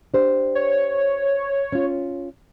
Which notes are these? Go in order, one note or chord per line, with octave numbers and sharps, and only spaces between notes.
D4 G4 C5
C#5
C#4 F4